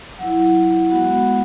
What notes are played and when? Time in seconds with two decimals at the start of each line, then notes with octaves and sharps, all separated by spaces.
0.19 F#3 E4 F#5
0.91 G#3 B3 F#4 F#5